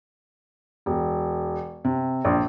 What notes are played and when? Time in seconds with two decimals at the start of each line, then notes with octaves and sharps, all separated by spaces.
0.86 E1
1.84 C3
2.25 A#1